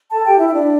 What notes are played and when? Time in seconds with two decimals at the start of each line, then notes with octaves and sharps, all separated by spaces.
0.11 A4 A5
0.25 G4 G5
0.39 E4 E5
0.49 E5
0.54 D4 D5